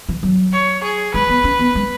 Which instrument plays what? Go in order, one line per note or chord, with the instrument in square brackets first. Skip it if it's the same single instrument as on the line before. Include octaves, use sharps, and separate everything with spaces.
[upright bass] E3
F#3
[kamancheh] C#5
G#4
[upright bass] G#3 [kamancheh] B4
[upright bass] B3
C#4
B3
G#3